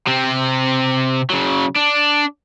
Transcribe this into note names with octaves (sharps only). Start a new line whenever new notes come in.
C3 C4
C#3 F#3
D4